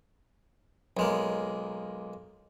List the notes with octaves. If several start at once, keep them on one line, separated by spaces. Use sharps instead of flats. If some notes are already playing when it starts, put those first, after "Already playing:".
B1 G#3 A#3